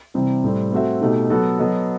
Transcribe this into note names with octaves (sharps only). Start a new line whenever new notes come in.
C3 E3 G3 C4
A2 G3 C4
A3 C4 F#4 C5 E5
B2 A3 D#4 G4
F#3 B3 F#4 A4
F#3 B3 F#4 A4 D#5